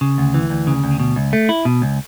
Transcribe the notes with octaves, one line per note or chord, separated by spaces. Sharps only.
C#3
D2
E3
D2
C#3
D2
B2
C#2
A3
E4
B2
C#2